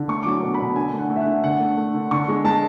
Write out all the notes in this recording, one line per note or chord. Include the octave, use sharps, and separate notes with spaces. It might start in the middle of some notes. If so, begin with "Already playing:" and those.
Already playing: D3
A3 C#6
F#3 D6
C#6
B2
B2 B5
D3 G#5
A3
F#5
A3
E5
F#5
D3
D3 F#5
A3
A3
D3
D3 C#6
G#3
G#3 A5